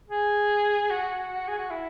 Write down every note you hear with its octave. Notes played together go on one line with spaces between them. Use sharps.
G#4
F#4
G#4
F#4
E4